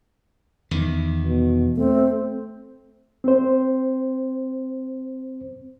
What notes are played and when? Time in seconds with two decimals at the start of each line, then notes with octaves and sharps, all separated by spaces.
0.71 E2 D#3
1.24 B2
1.77 A3 C4
3.24 C4 C5